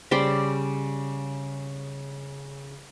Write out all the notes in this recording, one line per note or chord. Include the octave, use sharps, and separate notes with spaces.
C#3 G3 C5 D5